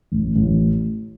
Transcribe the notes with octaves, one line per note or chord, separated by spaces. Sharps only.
A1
A1